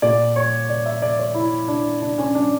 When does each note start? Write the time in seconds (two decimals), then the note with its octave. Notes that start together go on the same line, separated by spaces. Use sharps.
0.02 A#2 D5
0.36 C#5
0.70 D5
0.86 E5
1.02 D5
1.18 C#5
1.35 E4
1.68 D4
2.02 D4
2.18 C#4
2.35 D4